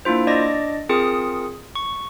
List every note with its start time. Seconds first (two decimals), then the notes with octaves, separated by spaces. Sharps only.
0.05 A#3 D4 E4 F4 C5
0.27 D4 D5 D#5 D6 A#6
0.89 C4 F4 G#4 A#4 D#6 C#7
1.76 C#6